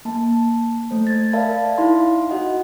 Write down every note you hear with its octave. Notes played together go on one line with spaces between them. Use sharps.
A#3 A5
A3 C5
G#6 A6
A#4 D5 E5 F5 A5 B5
D#4 E4 F5 B5 C6
F#4 D#5 F#5